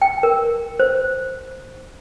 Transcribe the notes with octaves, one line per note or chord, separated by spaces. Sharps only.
G5
A#4
C5